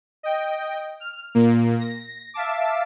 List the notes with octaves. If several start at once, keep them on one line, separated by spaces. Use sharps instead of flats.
D#5 G5
F6
A#2 A#3
A#6
E5 F5 A5 D6